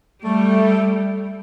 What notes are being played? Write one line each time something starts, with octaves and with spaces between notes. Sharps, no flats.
G3 A3